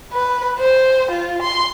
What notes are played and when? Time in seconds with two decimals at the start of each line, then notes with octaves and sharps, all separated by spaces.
0.13 B4
0.59 C5
1.11 F4
1.42 C6